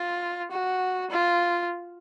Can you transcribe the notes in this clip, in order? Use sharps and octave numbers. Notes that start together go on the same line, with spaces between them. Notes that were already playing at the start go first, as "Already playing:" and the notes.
Already playing: F4
F#4
F4